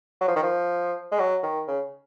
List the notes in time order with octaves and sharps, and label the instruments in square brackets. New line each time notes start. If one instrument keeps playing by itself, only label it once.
[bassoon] F#3
F3
D#3
F3
G#3
F#3
D#3
C#3